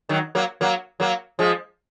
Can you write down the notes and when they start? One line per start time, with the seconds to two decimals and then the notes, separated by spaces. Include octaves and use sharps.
0.09 D#3 F#3
0.35 F#3 A#3
0.61 F#3 A#3
1.00 F#3 A#3
1.39 F3 G#3